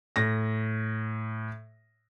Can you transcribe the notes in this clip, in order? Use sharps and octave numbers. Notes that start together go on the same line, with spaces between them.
A2 A#6